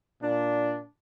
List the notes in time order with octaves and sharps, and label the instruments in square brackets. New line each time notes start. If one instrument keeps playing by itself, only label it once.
[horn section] A#2 D4